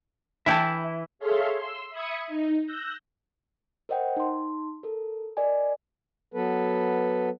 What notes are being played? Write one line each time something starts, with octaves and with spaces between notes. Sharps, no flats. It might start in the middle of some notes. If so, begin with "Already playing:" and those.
E3 E4 E5 G5 A5
G#4 A4 C#5 E5 F5 C6
C6 E6
E5 B5 D#6 G#6 C#7
D#4
E6 F#6 G6 A#6
A#4 C5 D#5 F#5 G5
D#4 C6
A4 A#4
A#4 D5 D#5 G#5
F#3 B3 A4 B4